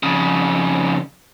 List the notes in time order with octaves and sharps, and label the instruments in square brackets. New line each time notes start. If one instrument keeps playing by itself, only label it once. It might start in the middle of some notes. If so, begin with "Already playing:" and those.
[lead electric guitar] F2 C#3